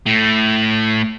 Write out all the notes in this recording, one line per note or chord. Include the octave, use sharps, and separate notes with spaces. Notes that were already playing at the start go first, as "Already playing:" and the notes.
A2 A3